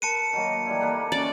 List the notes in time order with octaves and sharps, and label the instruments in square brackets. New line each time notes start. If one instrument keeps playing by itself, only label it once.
[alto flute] A#4 [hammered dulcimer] B4 [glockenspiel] A5 C#7 D#7
[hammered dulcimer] D#3 F#3 A#3 [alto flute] D#5
[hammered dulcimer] E3 G3 E4 [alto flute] D5
[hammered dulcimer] A#3 A4 B4
[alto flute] C#4 [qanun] D5